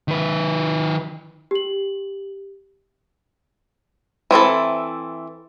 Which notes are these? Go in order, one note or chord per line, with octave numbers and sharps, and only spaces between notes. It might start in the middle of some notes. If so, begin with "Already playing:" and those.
D#3 B4
G4 F#7
E3 C4 E4 A4